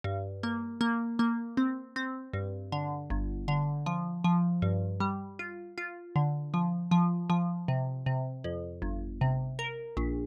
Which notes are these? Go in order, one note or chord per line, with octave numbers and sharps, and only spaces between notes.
G2
A#3
A#3
A#3
C4
C4
G2
D3
G1
D3
F3
F3
G2
G3
F4
F4
D3
F3
F3
F3
C3
C3
F2
G1
C3
A#4
A#1